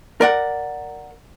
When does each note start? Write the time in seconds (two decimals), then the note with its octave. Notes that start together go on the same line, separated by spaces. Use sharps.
0.21 A#4 D5 F#5